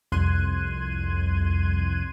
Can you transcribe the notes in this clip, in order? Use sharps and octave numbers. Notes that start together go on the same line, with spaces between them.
C2 F2 C6 F#6 G#6 D#7